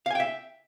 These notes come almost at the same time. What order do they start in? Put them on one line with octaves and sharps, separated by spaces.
F5 G#5 G5 E5